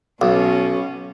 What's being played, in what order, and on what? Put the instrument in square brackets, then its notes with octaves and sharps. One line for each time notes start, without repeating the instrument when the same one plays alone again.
[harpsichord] B1 [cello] B2 C#4